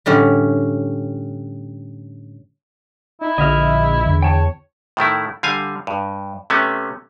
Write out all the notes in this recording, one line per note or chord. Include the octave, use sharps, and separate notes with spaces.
A2 D3 G3 C#4
D#4 E4
A#1 D3 D#5 E5 F6
E2 D3
C#5 G5 A5
A2 D#3 A3 E4
D3 G3 F5 G#5
G2
C3 A3 B3 C#4